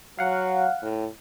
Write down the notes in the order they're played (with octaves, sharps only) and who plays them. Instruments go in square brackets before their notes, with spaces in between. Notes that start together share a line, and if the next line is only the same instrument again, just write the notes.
[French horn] F#3 [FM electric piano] F5 F#5
[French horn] A2